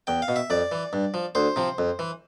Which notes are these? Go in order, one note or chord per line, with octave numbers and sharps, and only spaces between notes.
E2 G5
F5
B2
E5
F2 D5
E3
G2
F3
D2 C5
C3 F3
F2
E3